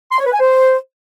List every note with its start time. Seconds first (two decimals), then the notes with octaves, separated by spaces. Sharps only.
0.12 C6
0.19 C#5
0.26 B4
0.33 G#5
0.40 C5